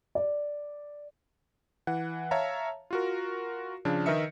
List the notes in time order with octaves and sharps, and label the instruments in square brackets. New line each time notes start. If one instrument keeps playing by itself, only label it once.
[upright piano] D5
[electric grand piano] E3 F#5
C#5 E5 F5 A5 A#5
F4 F#4 A#4
C#3 F3 D4
D#3 A#4 B4 D#5 E5 C#7